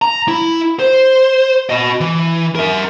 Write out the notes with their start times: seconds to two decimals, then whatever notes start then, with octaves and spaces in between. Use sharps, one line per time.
0.02 A#5
0.28 E4
0.79 C5
1.69 F#4 D#5
2.01 E3
2.55 A#4 E5